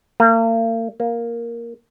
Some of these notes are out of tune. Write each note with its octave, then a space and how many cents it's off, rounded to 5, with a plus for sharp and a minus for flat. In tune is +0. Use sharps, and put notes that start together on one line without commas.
A#3 -40
A#3 +5